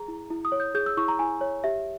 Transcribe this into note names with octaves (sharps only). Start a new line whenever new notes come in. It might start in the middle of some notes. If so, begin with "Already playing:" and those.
Already playing: G#4 A#5
E4
E4
D#6
C#5
G6
G#4 G6
E6
E4 C#6
A#5
E4 G#5
C#5
G4 E5